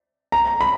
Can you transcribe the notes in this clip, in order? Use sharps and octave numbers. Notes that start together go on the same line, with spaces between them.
A#5
B5